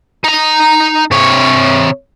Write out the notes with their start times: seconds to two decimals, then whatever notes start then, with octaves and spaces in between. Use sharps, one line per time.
0.24 D#4 A#5
1.11 C3 C#5